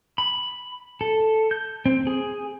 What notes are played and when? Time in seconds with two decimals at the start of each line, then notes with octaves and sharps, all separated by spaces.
0.18 B5
1.01 A4
1.51 G6
1.86 C4
2.07 G#4